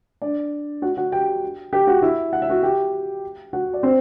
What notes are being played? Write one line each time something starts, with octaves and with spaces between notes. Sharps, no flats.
D4 D5
F#4 F#5
F#4 F#5
G4 G5
G4 G5
F#4 F#5
E4 E5
F#5
E5
F#4 F#5
G4 G5
F#4 F#5
D5
C4 C5